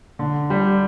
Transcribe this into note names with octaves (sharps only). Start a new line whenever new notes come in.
D3
G3